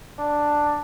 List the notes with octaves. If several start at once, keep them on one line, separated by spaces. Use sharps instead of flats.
D4